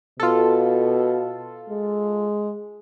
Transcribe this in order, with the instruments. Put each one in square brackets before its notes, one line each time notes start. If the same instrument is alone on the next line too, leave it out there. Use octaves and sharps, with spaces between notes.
[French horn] B2 [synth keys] F4 A4
[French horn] G#3